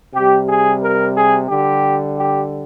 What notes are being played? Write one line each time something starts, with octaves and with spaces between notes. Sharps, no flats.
C3 G3 G4
G#4
A#4
G#4
D3 G3 G4
G4